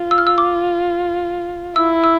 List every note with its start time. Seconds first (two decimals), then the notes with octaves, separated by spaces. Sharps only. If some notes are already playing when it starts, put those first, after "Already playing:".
Already playing: F4
0.11 E6
0.18 F6
0.27 E6
0.38 D6
1.76 E4 E6
2.04 E6